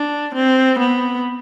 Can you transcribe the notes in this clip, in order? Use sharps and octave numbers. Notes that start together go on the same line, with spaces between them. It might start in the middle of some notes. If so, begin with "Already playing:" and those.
Already playing: D4
C4
B3